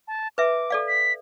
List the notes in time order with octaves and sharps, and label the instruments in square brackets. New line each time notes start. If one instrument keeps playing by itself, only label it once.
[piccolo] A5
[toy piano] B4 E5 [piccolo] D6
[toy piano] A4 D5 F5
[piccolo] B6